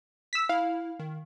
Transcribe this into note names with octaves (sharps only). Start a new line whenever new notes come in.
E6 B6
E4 F5
D#3